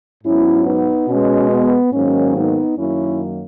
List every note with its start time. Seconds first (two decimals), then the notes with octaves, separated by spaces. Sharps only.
0.24 G#2 F#3 B3 C#4 E4
0.66 B3 D#4
1.08 B2 G#3 B3 C#4
1.51 B3
1.93 G#2 D#3 F#3 A#3 C#4
2.35 B3 D#4
2.77 F#2 D#3 F#3 A#3 C#4 E4